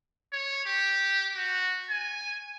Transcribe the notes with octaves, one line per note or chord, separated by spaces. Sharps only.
C#5
G4
F#4
G#5